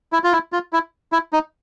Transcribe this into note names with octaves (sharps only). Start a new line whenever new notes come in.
E4
F4
E4
F4
E4
E4
D#4